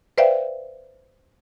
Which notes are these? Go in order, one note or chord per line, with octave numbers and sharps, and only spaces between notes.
B4 C5 D5 E5 F5 G5